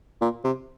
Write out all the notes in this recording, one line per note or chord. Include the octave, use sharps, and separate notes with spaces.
A#2
C3